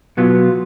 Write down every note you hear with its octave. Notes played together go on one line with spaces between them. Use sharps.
B2 F#3 B3 F4